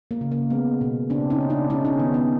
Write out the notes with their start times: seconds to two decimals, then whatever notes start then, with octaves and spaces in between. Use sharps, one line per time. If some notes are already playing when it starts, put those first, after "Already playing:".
0.11 A#3
0.21 C#3
0.32 A#3
0.50 G#3 B3
0.81 B2
1.10 C#3 C4 D4
1.30 C#4 D#4
1.41 C#3
1.50 D4 E4
1.70 G#3 C#4 D#4
1.85 C#4 D#4
1.99 D#3 B3
2.14 B3 C#4